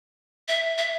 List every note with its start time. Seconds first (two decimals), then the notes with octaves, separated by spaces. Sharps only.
0.48 E5
0.78 E5